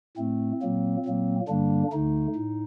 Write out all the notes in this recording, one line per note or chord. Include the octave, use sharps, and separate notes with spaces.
A2 A3 C4
A#2 F#3 A#3
A#2 F#3 A#3
G2 D3 G3 A#3 D4
D2 D3 A3 D#4
A2